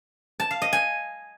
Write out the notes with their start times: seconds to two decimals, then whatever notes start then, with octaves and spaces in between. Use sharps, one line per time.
0.40 A5
0.51 F5
0.62 D#5
0.73 G#5